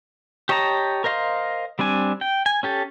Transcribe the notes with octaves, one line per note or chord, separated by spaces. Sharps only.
G4 C#5 D#5 A5 A#5
A#4 C5 D#5 F5 C6
G3 C4 D4 G#5
G5
G#5
C#4 G4 A4